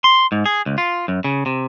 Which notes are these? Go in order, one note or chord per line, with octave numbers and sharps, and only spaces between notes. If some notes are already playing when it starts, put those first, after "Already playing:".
C6
G#2
G#4
C#2
F4
F#2
C#3
C3